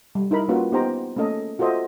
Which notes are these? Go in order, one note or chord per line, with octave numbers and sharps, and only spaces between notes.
G3
D#4 E4 A#4 B5
A#3 C#4 F4 F#4 B4
B3 D#4 G4 C5 G5 A#5
A3 A#3 C#4 A4 D#5
F4 F#4 A4 C5 D#5 E5